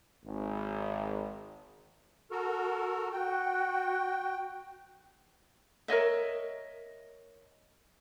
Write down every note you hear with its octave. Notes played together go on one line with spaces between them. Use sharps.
G#1
F#4 A4 A#4
F#4 G5
A#4 C#5 D#5 E5